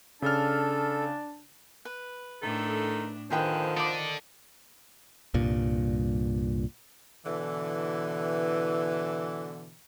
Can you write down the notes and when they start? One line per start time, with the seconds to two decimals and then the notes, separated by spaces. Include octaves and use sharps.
0.22 C#3 D4 A4 A5 F6
1.85 B4
2.42 A2 D#3 D4 A4
3.30 D3 D#3 F3 G#4 B4 C5 G5
3.77 A4 D5 D#5 D6
5.34 C2 G2 A#2
7.25 B2 D3 E3